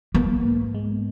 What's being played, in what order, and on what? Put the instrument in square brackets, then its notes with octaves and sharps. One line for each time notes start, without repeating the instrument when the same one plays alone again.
[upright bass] A#3 [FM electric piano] B3
[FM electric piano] G#2
G#3